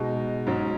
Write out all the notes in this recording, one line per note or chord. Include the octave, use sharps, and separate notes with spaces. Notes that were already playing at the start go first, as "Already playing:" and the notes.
Already playing: B2 G#3 D#4
G#2 F#3 C#4